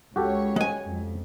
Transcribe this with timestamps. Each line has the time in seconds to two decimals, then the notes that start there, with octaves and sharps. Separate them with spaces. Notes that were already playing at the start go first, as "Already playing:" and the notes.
0.16 C#2 F#4 G4 A4 C#5
0.56 G#3 G#5
0.87 F2